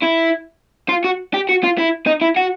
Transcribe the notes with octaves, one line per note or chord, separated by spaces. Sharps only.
E4
F4
F#4
G4
F#4
F4
E4
D#4
E4
F#4